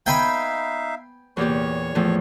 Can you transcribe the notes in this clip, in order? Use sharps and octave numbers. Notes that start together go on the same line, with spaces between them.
B3 D#4 E5 F5 G5 G#5 B5
E2 A#2 G4 C#5 C#6
E2 A2 F3